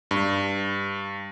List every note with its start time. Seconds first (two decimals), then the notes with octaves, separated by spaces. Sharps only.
0.11 G2